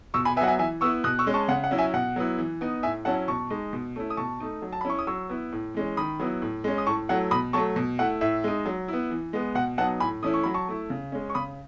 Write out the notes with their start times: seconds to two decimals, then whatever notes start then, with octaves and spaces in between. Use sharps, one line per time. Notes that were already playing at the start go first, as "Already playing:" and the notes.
0.14 B2 C#6 E6
0.25 G#5 B5
0.36 B3 E5 G#5
0.41 F#3 F#5
0.47 E5 G#5
0.59 E3 E5 G#5
0.81 B3 E4 C#6 E6
1.04 B2 D#6 F#6
1.19 C#6 E6
1.27 G#3 C#4
1.34 A5 C#6
1.48 C#3 F#5
1.64 F#5
1.71 F#3 C#4 E4
1.78 E5 G#5
1.94 B2 F#5
2.16 F#3 B3 E4
2.38 E3
2.61 B3 D#4
2.83 A2 E5 G#5
3.05 F#3 C#4 E4 F#5 A5
3.28 B2 A5 C#6
3.50 G#3 D#4
3.73 B2
3.96 A3 C#4 E4
4.10 D#6
4.17 B2 A5 C#6
4.40 A3 D#4
4.62 F#3
4.73 A5
4.81 B5
4.85 C#4 E4 C#6
4.99 D#6
5.07 F#3 C#6 E6
5.29 B3 E4
5.52 A2
5.74 E3 G#3 C#4
5.97 D#3 B5 D#6
6.19 F#3 B3 E4
6.42 A2
6.64 G#3 C#4
6.78 D#6
6.87 A2 A5 C#6
7.09 F#3 A3 E4 F#5
7.31 B2 B5 D#6
7.53 F#3 A3 A5 C#6
7.76 B2
7.99 A3 E4 F#5
8.21 A2 E5
8.44 G#3 D#4
8.65 F#3
8.88 B3 E4
9.11 E3
9.33 G#3 B3
9.55 B2 F#5
9.78 F#3 B3 D#4 F#5 A5
10.00 A2 G#5 B5
10.22 E3 A3 C#4 E4 D#6
10.34 C#6
10.43 F#3 B5
10.54 A5 C#6
10.68 A3 E4
10.90 C#3
11.12 G#3 C#4
11.30 C#6
11.35 C#3 B5 D#6